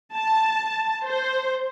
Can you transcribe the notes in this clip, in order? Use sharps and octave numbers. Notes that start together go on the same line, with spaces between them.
A5
C5